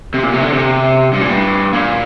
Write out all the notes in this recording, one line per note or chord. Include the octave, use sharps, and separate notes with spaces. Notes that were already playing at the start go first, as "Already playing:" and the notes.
C3
A#2
C3
D3
C3
G2
A#2
G2
A#2